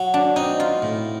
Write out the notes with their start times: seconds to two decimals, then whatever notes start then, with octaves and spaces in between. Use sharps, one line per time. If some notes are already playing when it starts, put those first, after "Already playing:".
Already playing: F#3
0.14 D4
0.36 C4 D#4
0.60 F4
0.82 A2